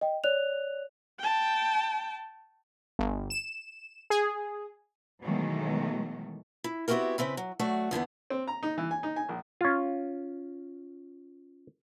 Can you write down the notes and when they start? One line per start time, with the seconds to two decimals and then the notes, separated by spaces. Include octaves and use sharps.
0.01 D#5 G5
0.24 C#5 D5 F#6 F7
1.19 G5 A5
2.99 G1
3.30 E7
4.10 G#4
5.23 B2 D#3 E3 F#3 G#3 A3
6.64 E4
6.88 B3 C4 E4 F#4 G4 A#4
7.18 C#3 C4 E4 B4
7.37 F#3
7.59 F#3 A3 F#4 D5
7.91 E2 D3 E3 B3
8.30 C4
8.47 A#5
8.63 D#4
8.78 E3
8.91 G#5
9.03 D#4
9.16 G#5
9.29 A#1
9.61 C#4 F4